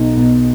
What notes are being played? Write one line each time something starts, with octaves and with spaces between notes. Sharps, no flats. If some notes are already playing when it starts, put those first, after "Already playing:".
Already playing: B1 B2 D#4
B2